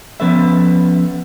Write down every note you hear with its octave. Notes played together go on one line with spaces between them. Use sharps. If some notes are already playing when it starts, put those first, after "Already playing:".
F3 B3 C#4 A4 B4 E5